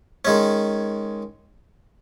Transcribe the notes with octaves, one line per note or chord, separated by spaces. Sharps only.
D#3 G#3 C#4